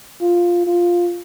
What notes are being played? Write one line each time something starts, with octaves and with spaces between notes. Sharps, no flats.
F4
F4